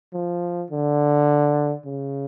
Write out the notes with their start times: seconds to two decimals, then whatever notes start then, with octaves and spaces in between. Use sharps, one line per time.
0.13 F3
0.71 D3
1.85 C#3